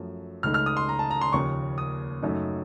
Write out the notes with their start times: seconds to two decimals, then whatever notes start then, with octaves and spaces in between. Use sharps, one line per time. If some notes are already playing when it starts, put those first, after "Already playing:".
Already playing: F#2 F3 A3
0.43 C#2 C#3 A3 D#4 F6
0.54 F6
0.66 D#6
0.77 C6
0.89 A#5
0.99 A5
1.11 A#5
1.21 C6
1.33 D#2 C#3 F3 A#3 C#6
1.78 D#6
2.22 F#2 C#3 A3 D#4